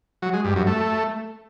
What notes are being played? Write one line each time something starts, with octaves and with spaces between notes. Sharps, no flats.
F#3
G#3
G2
F#2
A3